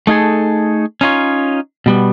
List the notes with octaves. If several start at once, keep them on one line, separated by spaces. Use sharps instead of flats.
A3 D#4 F4 G#4 A4
C#4 D#4 F4 C#5
B2 G3 B3